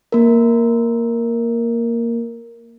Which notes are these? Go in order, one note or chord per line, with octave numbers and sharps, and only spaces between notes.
A#3 A#4